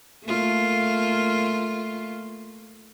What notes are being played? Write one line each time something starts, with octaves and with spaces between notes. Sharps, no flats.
A3 A#3 F4